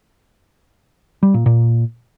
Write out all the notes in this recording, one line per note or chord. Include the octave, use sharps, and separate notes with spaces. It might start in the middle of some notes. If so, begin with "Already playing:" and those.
G3
A#2
A#2